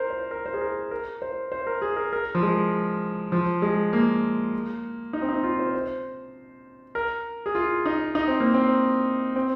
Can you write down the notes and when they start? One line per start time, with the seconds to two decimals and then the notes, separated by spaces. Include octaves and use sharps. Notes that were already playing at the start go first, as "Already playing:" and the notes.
Already playing: A#4 C5
0.10 C5
0.31 A#4
0.46 C5
0.54 G#4
0.61 A#4
0.91 A#4
1.22 C5
1.52 C5
1.67 A#4
1.82 G#4
1.96 A#4
2.12 A#4
2.35 F3
2.43 G#3
3.32 F3
3.62 G#3
3.93 A#3
5.13 D#4
5.22 C4
5.29 D#4
5.43 F4
5.59 C5
5.74 C5
6.95 A#4
7.46 G#4
7.55 F4
7.86 D#4
8.15 D#4
8.28 C4
8.40 A#3
8.54 C4
9.36 C4